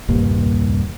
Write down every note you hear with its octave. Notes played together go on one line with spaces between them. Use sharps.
D#1 C2 G2 A#3